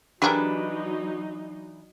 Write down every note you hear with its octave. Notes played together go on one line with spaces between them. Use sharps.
E3 F#3 D4 D#4 G4 G#4 A#4 B4